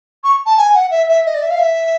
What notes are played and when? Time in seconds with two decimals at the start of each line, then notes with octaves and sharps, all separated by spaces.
0.24 C#6
0.46 A5
0.57 G#5
0.74 F#5
0.90 E5
1.08 E5
1.25 D#5
1.34 D5
1.42 E5
1.50 F5
1.59 E5